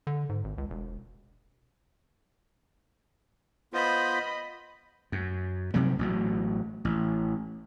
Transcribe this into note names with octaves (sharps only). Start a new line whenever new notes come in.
D3
G#2
G#1
C#2
E1
B3 F4 C5 D#5 B5
F#2
C3 F#3 G3
A1 B2 F#3
A1